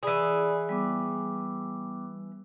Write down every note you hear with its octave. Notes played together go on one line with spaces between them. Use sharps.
E3 G#4 D5 B5 D#6
G3 B3 D6